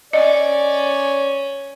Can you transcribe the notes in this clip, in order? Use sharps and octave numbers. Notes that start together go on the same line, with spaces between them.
C#4 D5 D#5